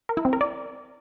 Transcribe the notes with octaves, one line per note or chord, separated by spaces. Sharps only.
A#4
E4
C4
A#4
D5